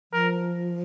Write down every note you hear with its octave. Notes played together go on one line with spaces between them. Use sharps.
F3 A#4